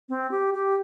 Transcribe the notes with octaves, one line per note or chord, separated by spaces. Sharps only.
C4
G4
G4